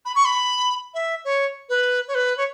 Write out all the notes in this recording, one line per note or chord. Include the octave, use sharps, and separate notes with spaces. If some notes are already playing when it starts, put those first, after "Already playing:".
B5
C#6
B5
E5
C#5
B4
C#5
B4
C#5